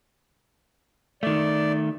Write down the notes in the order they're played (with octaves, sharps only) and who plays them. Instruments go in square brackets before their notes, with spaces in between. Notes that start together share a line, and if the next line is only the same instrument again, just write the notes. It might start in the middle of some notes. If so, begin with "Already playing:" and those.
[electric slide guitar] D#3 A3 [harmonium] D5